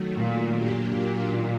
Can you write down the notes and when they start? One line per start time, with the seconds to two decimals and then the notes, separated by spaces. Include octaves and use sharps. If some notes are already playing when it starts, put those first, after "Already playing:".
Already playing: D#3 F#3 A3
0.20 A#2
0.55 F#3 A#3 D4 G4
0.91 A#2
1.26 D#3 F#3